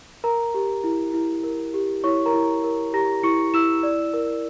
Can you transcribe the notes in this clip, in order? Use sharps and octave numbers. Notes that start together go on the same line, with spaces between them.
A#4 A#5
G4
E4
E4
A#4
G4
E4 C#5 C#6
A#4 A#5
E4
A#4
G4 A#5 A#6
E4 C#6 C#7
E4 E6 E7
D5
A#4